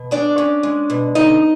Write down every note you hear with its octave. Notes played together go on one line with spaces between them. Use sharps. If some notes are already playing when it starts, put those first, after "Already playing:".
Already playing: B2
G#3 D4 D5
C#4
G#3
B2
D3 D#4 D#5